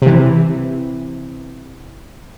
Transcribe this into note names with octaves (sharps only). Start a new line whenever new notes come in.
C3 E3